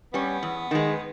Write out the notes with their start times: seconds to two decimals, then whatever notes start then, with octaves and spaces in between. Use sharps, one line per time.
0.13 G3 B3 C#4
0.43 E2
0.71 D#3 G#3